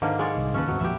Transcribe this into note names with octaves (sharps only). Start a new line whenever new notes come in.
G#2 D3 D#3 A#3
G#3 C#5 D5
C2
A1 D#2 C#4 A4 B4
D#2 G#2 F#3 C4
A#1 F2 A#2 G4 B4 E5